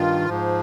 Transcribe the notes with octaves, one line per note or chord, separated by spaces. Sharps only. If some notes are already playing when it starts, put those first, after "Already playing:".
Already playing: G2 D#3 F4
G#2 F3